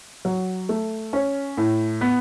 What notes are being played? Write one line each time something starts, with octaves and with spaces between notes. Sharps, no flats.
F#3
A3
C#4
A2
B3